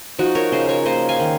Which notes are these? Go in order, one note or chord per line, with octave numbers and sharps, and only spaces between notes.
F3 D#4 F#4
A#4 C#5
C#3 C5 D#5
A#4 C#5
A#3 C5 D#5
F5 G#5
D#3